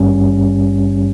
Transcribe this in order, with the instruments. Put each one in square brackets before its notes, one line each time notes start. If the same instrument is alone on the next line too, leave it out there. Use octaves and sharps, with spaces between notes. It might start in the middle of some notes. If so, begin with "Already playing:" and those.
Already playing: [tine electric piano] G#1 G2 G3 C#4